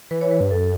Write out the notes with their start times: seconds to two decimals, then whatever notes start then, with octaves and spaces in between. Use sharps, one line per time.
0.11 E3 B4
0.21 C#5
0.31 B4
0.41 G2
0.51 F#2 A4